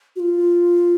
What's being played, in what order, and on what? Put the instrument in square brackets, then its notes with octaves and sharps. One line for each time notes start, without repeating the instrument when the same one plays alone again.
[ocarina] F#4
F4